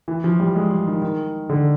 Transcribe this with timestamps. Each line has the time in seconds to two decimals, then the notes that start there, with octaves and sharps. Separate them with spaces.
0.08 E3
0.24 F3
0.40 G3
0.55 G#3
0.71 G3
0.87 D#3
1.02 D#3
1.49 D3